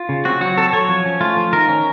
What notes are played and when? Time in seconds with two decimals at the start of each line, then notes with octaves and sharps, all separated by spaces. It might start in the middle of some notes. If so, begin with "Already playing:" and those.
Already playing: F4
0.09 C#3
0.25 C4 F#4
0.41 F#3 F#4
0.58 C4 A4
0.73 F#3 C#5
0.89 F3
1.06 C#4
1.21 A3 F4
1.37 F3
1.53 D#3 A#4
1.69 C#4